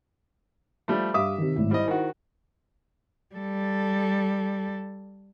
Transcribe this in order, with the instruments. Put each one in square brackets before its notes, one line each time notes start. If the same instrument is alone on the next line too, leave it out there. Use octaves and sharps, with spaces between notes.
[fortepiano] F3 G3 A3
[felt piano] G2 F5 D#6 [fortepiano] E5 D6
[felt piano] C3 D#3
G#1 A2 E4
[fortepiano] G3 D#5 [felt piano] E4 C5
[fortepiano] D#3 F#4
[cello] G3 A4